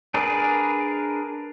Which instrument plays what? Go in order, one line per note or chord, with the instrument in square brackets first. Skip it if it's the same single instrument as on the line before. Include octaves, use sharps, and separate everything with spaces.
[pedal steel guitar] D4 G#4 A#4 B4 D5